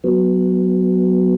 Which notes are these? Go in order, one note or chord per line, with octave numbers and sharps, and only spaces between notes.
F#3 B3